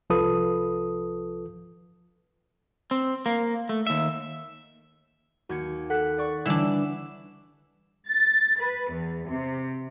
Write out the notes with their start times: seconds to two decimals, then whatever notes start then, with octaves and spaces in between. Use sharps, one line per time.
0.10 C2 F3 F4 A4 B4 D#6
2.91 C4
3.26 A#3
3.69 A3
3.87 D#2 E5
5.49 D#2 F#4 G#6 C#7
5.90 A4 F#5 F#6 B6
6.18 D5 C#6
6.45 D3 E3 G3 D4 E6 E7
8.08 A6
8.60 B4
8.91 E2
9.29 C3